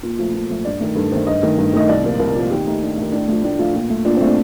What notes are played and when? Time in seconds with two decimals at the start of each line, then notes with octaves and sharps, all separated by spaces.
0.03 A#2
0.19 F3 A3
0.34 A#2
0.49 F3 A3
0.65 G2 D5
0.80 D#3 A3
0.95 G2 A4
1.11 D#3 A3 C5
1.27 G2 D#5
1.43 D#3 A3
1.58 G2
1.73 D#3 A3 D#5
1.89 C2 D5
2.04 A#2 F3 A#3
2.19 C2 A#4
2.35 A#2 F3 A#3
2.51 D#2 G4
2.66 D#3 A3 D#4
2.82 D#2 D4
2.97 D#3 A3
3.12 A2 D4
3.28 F3 A3
3.43 A2 D4
3.59 F3 A3 F4
3.74 A#2
3.90 A3
4.05 A#2 D4
4.17 A3 C4
4.27 D4